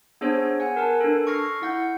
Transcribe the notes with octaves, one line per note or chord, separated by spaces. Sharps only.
B3 D4 G#4 C5 C#5
F#5 G#5
A#4 B4 A5
D4 A4
C#6 F6 A#6 C7
E4 F#5 G6